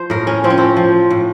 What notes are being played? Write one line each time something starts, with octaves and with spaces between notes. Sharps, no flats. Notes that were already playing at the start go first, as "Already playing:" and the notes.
Already playing: F3 C5
A2 A#4
C#4
F3 C4
C#4
C4
F3
A2